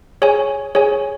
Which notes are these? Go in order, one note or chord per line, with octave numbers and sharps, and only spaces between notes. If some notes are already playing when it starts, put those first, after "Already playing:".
G#4 C#5 G#5
G#4 C#5 G#5